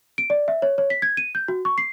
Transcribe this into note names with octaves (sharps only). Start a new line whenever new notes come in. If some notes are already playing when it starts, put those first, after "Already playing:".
D7
D5
E5
C#5
C#5
B6
G#6
D#7
G6
F#4
C#6
C7